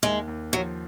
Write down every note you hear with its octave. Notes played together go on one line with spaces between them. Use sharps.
D#2 G#3
D#2
F3 F#3